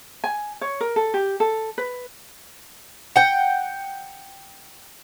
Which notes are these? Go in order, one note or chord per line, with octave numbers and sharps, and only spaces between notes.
G#5
C#5
A#4
A4
G4
A4
B4
F#5 G5